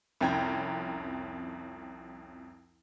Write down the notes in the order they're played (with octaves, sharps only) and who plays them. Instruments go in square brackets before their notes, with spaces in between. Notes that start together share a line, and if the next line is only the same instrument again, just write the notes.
[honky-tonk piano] C2 F2 C#4 G5 A#5 G#6